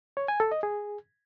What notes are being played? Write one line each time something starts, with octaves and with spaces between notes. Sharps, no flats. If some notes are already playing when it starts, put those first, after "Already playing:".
C#5
G#5
A4
D#5
G#4